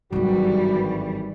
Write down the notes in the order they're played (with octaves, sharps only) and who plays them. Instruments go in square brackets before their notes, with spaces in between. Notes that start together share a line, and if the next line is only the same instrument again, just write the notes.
[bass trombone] G#1 [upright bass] G2 F#3 [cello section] E3 G3 [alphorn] F#4